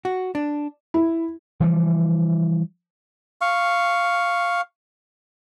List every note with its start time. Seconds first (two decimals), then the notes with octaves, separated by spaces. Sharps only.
0.05 F#4
0.35 D4
0.94 E4
1.60 E3 F3 G3
3.41 F5 C#6